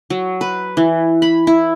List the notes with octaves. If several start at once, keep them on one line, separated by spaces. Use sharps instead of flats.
F#3
B4
E3
B5
E4